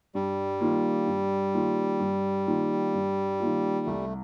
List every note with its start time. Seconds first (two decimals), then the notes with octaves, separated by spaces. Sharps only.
0.15 G2 G3
0.61 D#3 A#3 F4
1.07 G2
1.54 D#3 A#3 F4
2.00 G2
2.47 D#3 A#3 F4
2.94 G2
3.40 D#3 A#3 F4
3.86 C2 A3